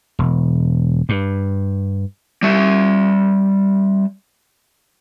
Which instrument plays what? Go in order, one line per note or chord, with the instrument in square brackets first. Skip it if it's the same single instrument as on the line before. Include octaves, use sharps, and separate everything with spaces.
[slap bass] E1
G2
[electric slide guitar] G3 E5